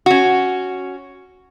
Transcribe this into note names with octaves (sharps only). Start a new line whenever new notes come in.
C#4 F#4